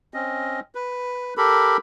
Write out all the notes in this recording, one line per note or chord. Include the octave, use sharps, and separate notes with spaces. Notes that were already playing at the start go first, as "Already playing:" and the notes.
C4 C#4 D#5
B4
G4 A4 A#4 B5